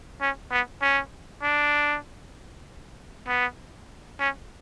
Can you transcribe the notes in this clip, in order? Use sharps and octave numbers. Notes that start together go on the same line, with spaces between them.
C#4
B3
C#4
D4
B3
C#4